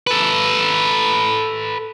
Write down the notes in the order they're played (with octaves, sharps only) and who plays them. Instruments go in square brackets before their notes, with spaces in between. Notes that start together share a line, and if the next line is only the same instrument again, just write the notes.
[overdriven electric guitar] A4 B4